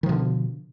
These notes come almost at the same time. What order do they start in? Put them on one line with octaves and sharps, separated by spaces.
D#3 F3 B2 D3